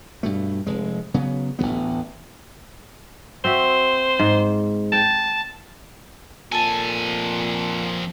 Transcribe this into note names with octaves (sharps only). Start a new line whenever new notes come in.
G2 B2 A3
F1 G#3
C#3 F#3 B3
A1 D2 F#3 B3
C4 F#4 C5 E5
G#2
G5 A5
F2 A#2 A4 G#5 A5